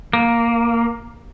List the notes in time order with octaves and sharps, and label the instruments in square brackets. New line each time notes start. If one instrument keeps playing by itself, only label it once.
[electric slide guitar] A#3